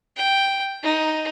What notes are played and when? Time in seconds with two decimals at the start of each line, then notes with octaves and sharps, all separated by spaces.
0.17 G5
0.83 D#4